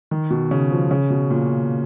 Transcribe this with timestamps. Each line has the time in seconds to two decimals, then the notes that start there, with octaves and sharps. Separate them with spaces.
0.11 D#3
0.30 B2
0.51 C#3
0.70 F3
0.91 C#3
1.10 B2
1.30 A#2